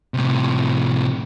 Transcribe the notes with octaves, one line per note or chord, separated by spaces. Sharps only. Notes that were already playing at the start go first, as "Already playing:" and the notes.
A2 C3